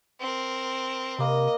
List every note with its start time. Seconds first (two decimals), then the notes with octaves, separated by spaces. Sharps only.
0.21 C4 A#4
1.18 C3 A#3 D#5 B5